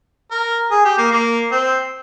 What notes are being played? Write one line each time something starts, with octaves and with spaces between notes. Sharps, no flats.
A#4
G#4
G4
A#3
A#3
C4